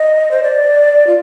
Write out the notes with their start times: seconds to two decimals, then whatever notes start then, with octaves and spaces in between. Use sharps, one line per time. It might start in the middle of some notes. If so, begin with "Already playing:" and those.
Already playing: D#5
0.31 C5
0.43 D5
1.07 F4